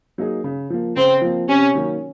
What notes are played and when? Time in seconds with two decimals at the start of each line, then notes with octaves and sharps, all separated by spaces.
0.18 F#3 A#3 D#4 G#4
0.44 C#3
0.70 F3 A#3
0.97 C#3 C4
1.21 F3 A#3
1.48 C3 C#4
1.74 D#3 F#3 A#3